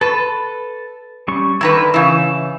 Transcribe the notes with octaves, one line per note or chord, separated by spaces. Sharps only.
A4 B4 A5
G3 C#4 C#6
D3 D#3 E4 B4 A#5 B5
C#3 E3 E5